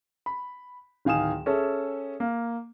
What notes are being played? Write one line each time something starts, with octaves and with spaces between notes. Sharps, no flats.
B5
D1 D#3 F5 G#5 D#6 E7
C#4 G#4 A4 E5
A#3